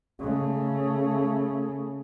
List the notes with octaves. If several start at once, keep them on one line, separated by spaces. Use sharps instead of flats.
C#3 A3